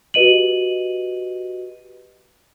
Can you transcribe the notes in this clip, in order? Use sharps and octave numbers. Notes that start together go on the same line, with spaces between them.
F#4 G4 B4 D#5 D#7 F#7